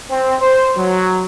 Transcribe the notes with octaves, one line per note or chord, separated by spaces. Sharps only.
C4
C5
F#3